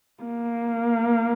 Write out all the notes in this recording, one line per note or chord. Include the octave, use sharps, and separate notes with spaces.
A#3